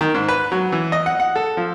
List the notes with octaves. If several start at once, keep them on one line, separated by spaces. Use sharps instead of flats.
D#3
G#2
B4
F#3
E3
D#5
F#5
F#5
A4
F3